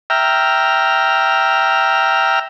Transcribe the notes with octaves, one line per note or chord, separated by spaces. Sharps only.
E5 G5 A#5 F6